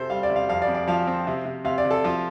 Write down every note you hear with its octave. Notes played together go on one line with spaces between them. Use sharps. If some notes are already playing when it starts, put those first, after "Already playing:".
Already playing: C3 C4 A4 C5
G3 F5
D5
C3
F5
F2 F5
D5
F2
D5
F3 F5
C4
C3
C3
C3 F5
D5
C3
A4
F3 F4